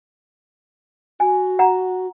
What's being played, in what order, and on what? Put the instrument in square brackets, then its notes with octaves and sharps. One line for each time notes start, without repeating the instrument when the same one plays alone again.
[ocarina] F#4 [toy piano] G#5
[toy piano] F#5 A#5